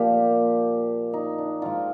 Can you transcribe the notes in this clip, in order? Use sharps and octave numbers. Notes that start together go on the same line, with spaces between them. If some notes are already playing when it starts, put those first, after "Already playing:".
Already playing: A#2 F3 F4 G4
D#4
D4
G#2 D#3 F4